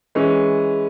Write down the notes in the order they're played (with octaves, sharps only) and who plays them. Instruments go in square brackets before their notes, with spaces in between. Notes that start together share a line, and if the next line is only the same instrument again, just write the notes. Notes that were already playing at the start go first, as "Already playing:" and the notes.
[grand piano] E3 G#3 C#4